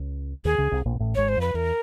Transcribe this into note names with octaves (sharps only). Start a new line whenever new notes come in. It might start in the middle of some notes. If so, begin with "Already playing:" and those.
Already playing: C#2 C#3
D#2 D#3 G#4
C#2 C#3
C2 C3
A#1 A#2
A#2
A1 A2
G#1 G#2 C#5
C5
F2 B4
E2 A#4